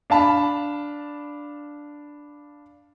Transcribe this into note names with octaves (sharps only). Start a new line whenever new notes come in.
D4 F5 A5 B5